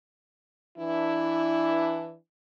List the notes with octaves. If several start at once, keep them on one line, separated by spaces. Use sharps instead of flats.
E3 D4 E4